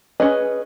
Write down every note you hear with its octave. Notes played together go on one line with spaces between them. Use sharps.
C#4 G#4 B4 D#5